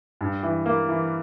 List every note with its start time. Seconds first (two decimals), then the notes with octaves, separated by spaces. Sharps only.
0.21 G2
0.43 E3
0.66 A#3
0.89 E3